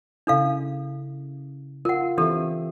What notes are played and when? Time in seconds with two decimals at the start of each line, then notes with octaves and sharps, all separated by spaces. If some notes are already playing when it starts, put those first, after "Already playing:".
0.27 C#3 D4 E4 A4 F5
1.85 F4 A#4 F#5
2.18 E3 C4 D4 G4 A4 E5